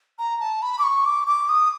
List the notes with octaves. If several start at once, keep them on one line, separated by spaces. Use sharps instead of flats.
A#5
A5
B5
D6
C#6
D6
D6
D#6